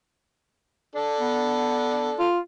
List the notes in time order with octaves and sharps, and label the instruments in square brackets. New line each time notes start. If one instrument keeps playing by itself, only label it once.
[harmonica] D4 A4
[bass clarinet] B3
F4